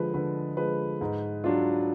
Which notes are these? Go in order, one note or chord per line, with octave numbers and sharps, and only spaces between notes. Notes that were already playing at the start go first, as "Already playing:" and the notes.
Already playing: D3 F3 G#3 B4
D3 B4
F3 G#3 B4
G#2
F#3 D4 F4